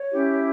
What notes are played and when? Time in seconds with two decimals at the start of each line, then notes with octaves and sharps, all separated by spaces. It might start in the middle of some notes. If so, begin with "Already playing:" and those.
Already playing: C#5
0.12 C#4 E4 G4